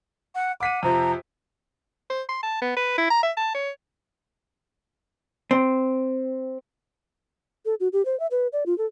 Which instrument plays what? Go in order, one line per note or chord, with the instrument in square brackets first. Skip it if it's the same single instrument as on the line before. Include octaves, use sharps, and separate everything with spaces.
[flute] F#5
[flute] F#5 [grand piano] D6 B6 D#7
[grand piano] F2 C3 F3 [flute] A#5
[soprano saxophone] C5
C6
A5
B3
B4
E4
A#5
E5
A5
C#5
[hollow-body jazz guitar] C4
[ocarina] A4
F#4
G4
C5
E5
B4
D5
F4
A4